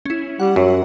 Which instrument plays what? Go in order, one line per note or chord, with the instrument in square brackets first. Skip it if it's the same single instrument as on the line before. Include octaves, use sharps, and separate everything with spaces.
[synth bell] C#4 E4
[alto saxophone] G3 [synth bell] F#5
[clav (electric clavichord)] F#2 [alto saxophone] F#3